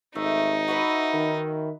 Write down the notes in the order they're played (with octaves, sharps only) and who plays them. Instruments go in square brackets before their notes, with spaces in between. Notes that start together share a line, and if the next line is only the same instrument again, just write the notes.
[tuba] G#1 [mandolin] A3 [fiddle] D#4
[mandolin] F#4 B4 E5
[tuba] D#3